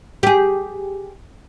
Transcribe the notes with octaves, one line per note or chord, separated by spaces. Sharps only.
G4 G#4